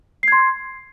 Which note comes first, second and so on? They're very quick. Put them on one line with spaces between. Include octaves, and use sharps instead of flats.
C7 G#6 C6